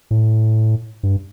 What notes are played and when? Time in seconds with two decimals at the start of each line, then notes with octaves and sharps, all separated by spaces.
0.11 A2
1.03 G2